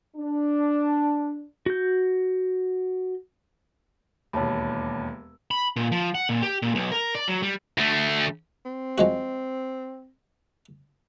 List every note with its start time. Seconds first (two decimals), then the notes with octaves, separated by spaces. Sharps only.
0.16 D4
1.66 F#4 G6
4.33 E1 D#2 C#5 A5 B5
5.51 B5
5.76 A#2
5.92 F3
6.15 F#5
6.29 A#2
6.42 G4
6.62 A#2
6.75 B1
6.91 A#4
7.15 D5
7.28 F#3
7.42 G3
7.78 D2 A3
8.65 C4
8.98 F3 G#3 F#4